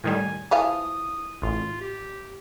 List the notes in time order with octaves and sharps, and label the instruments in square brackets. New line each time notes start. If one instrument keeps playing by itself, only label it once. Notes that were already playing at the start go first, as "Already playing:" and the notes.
[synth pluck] A2 D#3 G3 [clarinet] G#5
[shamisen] E3 F3 F5 [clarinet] D#6
[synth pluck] A1 [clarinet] F4
[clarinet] G4